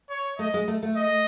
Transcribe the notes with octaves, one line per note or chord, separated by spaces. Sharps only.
C#5
A3 D#5
G#3
A3
A3
D#5